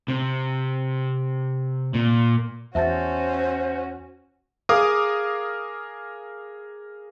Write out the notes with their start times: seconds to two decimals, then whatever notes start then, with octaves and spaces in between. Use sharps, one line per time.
0.08 C3
1.94 A#2
2.75 E2 C#4 F#4 C5 E5 A5 A6
4.69 G#4 A#4 F5 D6 D#6